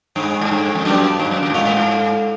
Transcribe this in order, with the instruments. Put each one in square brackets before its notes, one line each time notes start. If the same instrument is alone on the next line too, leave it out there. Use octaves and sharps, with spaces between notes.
[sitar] G2 [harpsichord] G#3 B3 D#4
[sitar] G#2
G2
F2
[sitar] F#2 [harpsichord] B2 G3 A#3 D4
[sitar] G2
F#2
F#2
G#2
[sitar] A2 [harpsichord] D3 F3 G#3 C#4 F4
[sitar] A2
G#2